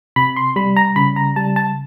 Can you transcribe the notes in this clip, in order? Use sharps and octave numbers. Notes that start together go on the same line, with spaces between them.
C3 B5
C6
G3 B5
A#5
C#3 B5
A#5
G3 A5
A5